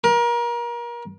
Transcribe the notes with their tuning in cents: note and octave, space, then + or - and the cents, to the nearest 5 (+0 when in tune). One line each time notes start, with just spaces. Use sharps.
A#4 +30